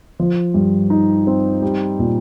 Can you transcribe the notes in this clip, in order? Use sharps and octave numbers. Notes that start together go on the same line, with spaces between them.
F3
G2
D#4
C4
G3
A#2